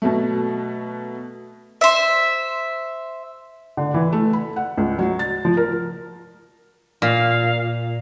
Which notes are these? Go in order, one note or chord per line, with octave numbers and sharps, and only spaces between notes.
B2 F#3 A3
C5 E5
D3
E3
A3
B5
F#5
C#2
F#3
A6
F3
A#4
A#2 F5